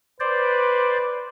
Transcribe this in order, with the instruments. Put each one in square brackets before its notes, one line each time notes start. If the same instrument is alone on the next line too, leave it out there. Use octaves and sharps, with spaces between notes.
[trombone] B4 [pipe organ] C5 D5